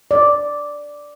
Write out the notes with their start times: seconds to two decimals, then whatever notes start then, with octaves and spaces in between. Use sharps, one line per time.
0.11 D5